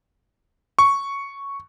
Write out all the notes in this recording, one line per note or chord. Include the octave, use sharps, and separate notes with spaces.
C#6